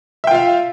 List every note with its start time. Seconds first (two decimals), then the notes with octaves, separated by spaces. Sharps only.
0.24 E5
0.27 G5
0.31 F4
0.35 F5